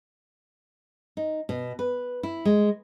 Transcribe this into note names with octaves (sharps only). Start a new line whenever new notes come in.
D#4
B2
B4
E4
G#3